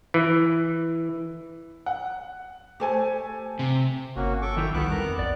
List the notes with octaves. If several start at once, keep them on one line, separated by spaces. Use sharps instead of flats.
E3
F#5
A3 G4 A4 C5 G#5
C3
G1 A#3 C#4 F#4
A4 C#6 D6
D#3 E4 F4 E5 G5
C2 D#3 G3 B3 A4 D6 F#6
F2 A#4
A#1 D5